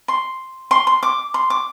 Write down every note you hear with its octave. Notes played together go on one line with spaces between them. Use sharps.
C6
C6
C6
D6
C6
D6